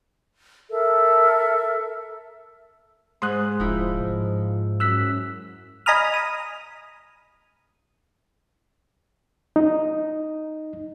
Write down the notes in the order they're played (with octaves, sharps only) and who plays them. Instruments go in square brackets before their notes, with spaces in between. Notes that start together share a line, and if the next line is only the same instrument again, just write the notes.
[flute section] A4 A#4 E5
[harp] G#2 [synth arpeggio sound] C6 D#6 F#6
[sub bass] D#1 [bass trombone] F3 [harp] D#4 E4
[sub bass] G#2
[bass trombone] F#2 [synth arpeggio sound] E6 F#6 B6
[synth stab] D#5 G#5 A#5 B5 D#6 F6
D#6
[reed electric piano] D#4